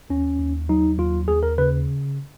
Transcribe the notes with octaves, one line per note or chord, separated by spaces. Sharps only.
D#2 C#4
D#2
F#3 D#4
D#2 F4
D#2 G#4
A#4
C#3 B4